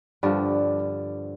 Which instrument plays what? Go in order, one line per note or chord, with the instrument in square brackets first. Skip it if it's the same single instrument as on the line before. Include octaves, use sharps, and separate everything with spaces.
[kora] G2 D3 F3 [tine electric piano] D5